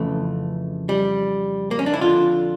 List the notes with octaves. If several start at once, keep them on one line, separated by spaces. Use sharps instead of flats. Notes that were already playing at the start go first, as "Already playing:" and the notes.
Already playing: F2 C#3 E3 A3
G3
A#3
C#4
D4
E4
F2 D3 F4